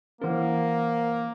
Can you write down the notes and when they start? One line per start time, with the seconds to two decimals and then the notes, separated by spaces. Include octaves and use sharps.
0.22 E3 A#3 C#4 A#4 C5 F#5